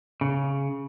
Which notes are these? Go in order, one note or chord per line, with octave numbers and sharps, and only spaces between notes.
C#3